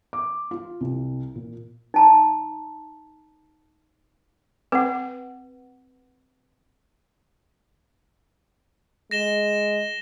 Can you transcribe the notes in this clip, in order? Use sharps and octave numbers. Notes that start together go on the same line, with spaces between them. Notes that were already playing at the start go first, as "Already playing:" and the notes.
D6
F4
C2
A#2
D#4 A5 A#5
C4 B4 F#5
G#3 A#6 E7 G7